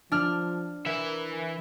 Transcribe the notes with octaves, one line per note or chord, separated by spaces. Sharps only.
F3 D4 F6
E3 A#4 E5